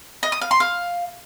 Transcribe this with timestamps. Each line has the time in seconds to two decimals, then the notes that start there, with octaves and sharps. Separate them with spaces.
0.23 D#5
0.32 D#6
0.41 F5
0.51 C6
0.60 F5